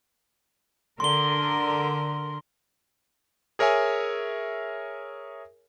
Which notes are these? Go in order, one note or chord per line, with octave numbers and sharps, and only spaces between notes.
D3 A#4 C6 G7
G#4 A#4 C#5 E5 G#5